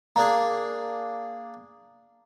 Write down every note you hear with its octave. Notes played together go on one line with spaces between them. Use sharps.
A#3 D4 G#4 A#5